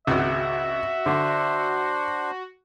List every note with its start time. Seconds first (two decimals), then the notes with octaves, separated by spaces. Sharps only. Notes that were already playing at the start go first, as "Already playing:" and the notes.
0.07 G#1 C#2 F#4 E5
1.06 D3 D4 C5